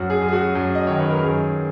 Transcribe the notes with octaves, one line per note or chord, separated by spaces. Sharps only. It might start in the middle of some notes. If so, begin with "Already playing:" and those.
Already playing: F#2 F#4
G#4
F#2
G#4
F#4
F#2
D#5
D#3 C#5
B4
A#4
F#2 G#4